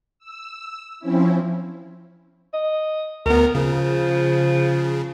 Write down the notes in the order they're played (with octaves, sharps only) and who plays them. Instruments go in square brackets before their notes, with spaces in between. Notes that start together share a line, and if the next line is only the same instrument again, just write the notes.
[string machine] E6
F3 C4 C#4 E4
[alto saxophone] D#5
[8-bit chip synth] D2 B3 [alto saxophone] A#4
[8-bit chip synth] C#3 [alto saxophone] F3